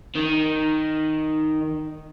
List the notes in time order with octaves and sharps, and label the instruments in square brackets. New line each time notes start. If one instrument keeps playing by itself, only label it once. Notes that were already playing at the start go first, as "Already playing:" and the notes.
[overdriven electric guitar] D#3